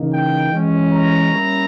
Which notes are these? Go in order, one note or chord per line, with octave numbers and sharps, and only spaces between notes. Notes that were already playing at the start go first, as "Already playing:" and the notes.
Already playing: C#3 E3 A#3 D#4
G5
E3 G#3 C#4
A#5
G3 A#3 C#4 E4